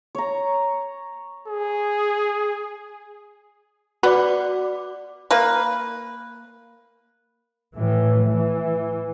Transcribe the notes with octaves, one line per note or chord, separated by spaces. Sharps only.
C#5 A#5
G#4
B3 F#4 D5 D6
A#3 B4
A2 E3
E3